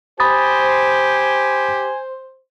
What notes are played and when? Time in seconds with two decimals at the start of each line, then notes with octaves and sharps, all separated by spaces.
0.20 G4 C5 G#5 B5 D#6 A6